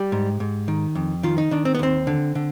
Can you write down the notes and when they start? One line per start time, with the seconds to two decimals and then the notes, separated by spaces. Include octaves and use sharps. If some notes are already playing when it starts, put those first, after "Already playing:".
Already playing: G3 G4
0.12 G#2
0.40 G#2
0.68 D#3
0.95 F2
1.23 D#3 F4
1.38 D#4
1.51 D#3 D4
1.65 C4
1.75 B3
1.79 D#2 C4
2.07 D3
2.35 D3